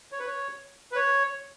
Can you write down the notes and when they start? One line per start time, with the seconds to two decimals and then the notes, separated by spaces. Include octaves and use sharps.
0.12 C#5
0.19 B4
0.27 C#5
0.92 B4
0.96 C#5